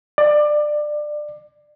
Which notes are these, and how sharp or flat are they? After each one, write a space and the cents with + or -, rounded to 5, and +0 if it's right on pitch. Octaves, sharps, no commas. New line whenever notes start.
D5 +20